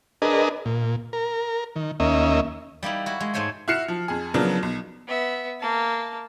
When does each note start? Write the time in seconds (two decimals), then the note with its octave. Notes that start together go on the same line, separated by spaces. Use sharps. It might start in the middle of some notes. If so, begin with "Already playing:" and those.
0.22 D4 G#4 A#4 B4 D#5
0.66 A#2
1.13 A#4
1.76 D#3
2.00 D#2 A#3 C#4 D#5 E5
2.83 G3 A#3 D#4 E4
3.06 E4 F#4
3.20 G#3
3.34 G#2 A3 C5 C#5 G#5
3.68 E4 F#4 F6 C7 C#7 E7
3.88 F3
4.08 F2 G#4
4.34 C#3 F3 F#3 A#3 B3 D4
4.63 B1
5.07 B3 E5
5.60 A#3 A5